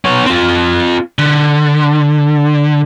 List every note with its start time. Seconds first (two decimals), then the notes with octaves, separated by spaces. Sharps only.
0.05 B3 C#5
0.26 C4 F4
1.19 D3